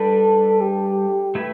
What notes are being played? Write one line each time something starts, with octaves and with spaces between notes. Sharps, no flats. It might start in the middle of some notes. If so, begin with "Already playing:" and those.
Already playing: G3 D4 A4 B4
G4
A3 E4 B4